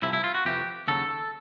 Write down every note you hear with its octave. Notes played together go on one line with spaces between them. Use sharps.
C2 C3 F3 E4
E4
F4
F#4
F2 C3 E3 G4
D#2 C#3 F#3 A4